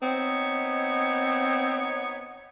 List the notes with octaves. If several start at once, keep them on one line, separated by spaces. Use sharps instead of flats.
B3 C4 D#4 C#5